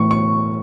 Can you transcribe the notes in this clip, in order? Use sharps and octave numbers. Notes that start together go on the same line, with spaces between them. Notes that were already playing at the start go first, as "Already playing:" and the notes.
Already playing: A2 E3 A3 C#6
C#6